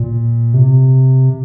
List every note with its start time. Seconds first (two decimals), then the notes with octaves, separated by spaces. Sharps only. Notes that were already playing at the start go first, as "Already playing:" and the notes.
Already playing: A#2
0.54 C3